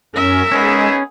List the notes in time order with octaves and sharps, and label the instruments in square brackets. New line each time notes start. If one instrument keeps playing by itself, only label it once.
[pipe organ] F#2 C#4 [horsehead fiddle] A#4 E5
[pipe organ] G#3 [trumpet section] B3 D#4 G#4 [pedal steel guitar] C#4